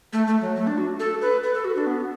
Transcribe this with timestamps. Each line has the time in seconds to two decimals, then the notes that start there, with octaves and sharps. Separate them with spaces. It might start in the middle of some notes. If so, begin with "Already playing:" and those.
0.13 A3
0.27 A3
0.42 F#3
0.56 A3
0.67 D4
0.78 F#4
1.00 A4
1.21 B4
1.43 B4
1.54 A4
1.65 F#4
1.76 D4
1.87 B3